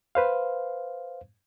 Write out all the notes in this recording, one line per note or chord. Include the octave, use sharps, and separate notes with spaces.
B4 C5 F5